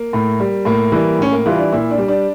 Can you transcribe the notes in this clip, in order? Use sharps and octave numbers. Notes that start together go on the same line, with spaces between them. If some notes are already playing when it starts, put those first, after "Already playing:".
Already playing: A#3
A2
G3
A2 A#3
E3 G3
A2 C#4
A#3
E3 G3 F4
D4
A#2 E4
D4
G3
D4